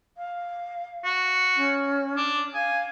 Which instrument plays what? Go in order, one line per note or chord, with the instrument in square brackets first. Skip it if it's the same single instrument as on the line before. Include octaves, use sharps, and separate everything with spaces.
[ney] F5
[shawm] F#4
[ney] C#4
[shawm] D4
[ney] F5 [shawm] G#5